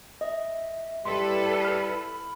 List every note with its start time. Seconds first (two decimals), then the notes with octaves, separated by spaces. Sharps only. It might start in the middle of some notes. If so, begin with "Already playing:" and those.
0.21 D#5 E5
1.05 G3 E4 A4 B4 C6
1.65 B5 F6